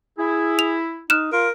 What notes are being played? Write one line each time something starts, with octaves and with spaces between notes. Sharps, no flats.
E4 G#4
F7
D#4 F6 F#6 E7
F4 A#4